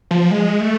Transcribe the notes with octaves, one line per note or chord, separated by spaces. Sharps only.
F3
G#3
A3